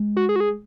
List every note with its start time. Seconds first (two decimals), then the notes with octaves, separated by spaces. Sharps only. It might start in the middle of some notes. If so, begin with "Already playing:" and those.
Already playing: G#3
0.17 F#4
0.29 G#4
0.36 F#4
0.40 G#4